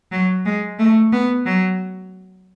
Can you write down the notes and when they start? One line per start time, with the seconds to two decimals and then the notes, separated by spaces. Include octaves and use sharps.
0.12 F#3
0.45 G#3
0.79 A3
1.12 B3
1.46 F#3